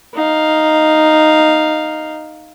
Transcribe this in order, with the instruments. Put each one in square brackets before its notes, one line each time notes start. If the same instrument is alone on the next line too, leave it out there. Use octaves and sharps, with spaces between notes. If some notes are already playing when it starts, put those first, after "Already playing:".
[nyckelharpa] D#4 F5